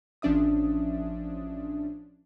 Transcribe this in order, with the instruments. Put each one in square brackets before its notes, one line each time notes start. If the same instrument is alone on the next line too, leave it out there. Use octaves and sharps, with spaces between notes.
[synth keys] A1 F3 C#4 D4 E5 D#6